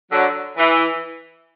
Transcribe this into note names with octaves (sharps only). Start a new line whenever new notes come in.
D3 F#3
E3